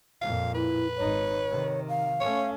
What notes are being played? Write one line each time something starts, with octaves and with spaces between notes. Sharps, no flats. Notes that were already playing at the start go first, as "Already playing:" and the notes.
F2 A#2 F5
E4 B4
G#1 D#4 C#5
C3 D#3
F5
A3 C#4 C#5